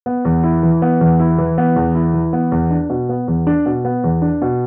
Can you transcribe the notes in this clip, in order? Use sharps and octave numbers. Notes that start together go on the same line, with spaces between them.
B3
E2
E4
E3
B3
E2
E4
E3
B3
E2
E4
E3
B3
E2
D4
B2
B3
E2
D4
B2
B3
E2
D4
B2